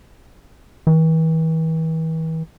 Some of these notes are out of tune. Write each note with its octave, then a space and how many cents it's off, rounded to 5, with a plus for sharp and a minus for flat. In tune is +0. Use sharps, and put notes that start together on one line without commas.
E3 -40